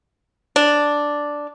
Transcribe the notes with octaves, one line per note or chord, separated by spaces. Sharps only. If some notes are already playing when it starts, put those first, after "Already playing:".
D4